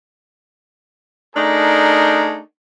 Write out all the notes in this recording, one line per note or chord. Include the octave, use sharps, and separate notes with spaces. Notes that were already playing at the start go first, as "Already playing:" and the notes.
A3 D4 D#4 G#4 A#4